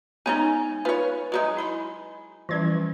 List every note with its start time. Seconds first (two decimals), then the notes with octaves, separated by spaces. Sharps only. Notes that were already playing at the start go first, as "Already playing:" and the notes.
0.26 G#3 B3 C#4 D#4 G#5 A#5
0.85 F4 B4 C#5
1.32 F#3 G#3 D#4
1.57 E4 B5 C6
2.49 E3 F3 G3 C#4 G#6